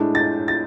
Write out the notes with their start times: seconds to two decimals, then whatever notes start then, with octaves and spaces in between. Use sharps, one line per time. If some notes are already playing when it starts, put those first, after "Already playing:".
Already playing: A2 G#3 D4
0.15 A6
0.48 A6